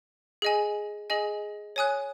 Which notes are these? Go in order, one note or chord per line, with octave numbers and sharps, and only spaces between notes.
G#4 D#5 G#5
G#4 D#5 G#5
C#5 G#5 D#6 F#6